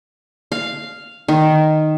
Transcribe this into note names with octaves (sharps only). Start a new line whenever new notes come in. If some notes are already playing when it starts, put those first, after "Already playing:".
F5
D#3